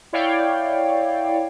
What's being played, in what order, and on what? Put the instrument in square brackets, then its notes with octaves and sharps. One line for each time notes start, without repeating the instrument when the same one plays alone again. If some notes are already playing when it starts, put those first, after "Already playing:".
[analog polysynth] E4 C#5 D5 F5 G5